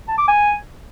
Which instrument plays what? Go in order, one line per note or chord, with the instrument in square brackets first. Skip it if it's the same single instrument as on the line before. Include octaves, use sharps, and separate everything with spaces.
[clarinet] A5
D6
G#5